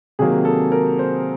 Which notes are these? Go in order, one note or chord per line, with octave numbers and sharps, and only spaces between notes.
C3 D#3 F#3 A#3 G#4
A4
A#4
C5